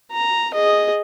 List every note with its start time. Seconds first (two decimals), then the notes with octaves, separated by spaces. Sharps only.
0.12 A#5
0.54 G#4 D#5